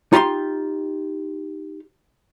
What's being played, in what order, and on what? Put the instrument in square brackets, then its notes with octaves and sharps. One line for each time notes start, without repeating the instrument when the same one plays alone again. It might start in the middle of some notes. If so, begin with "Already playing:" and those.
[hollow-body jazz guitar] D#4 F4 G4 A#5 C6